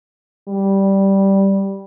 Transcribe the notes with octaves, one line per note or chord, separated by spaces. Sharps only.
G3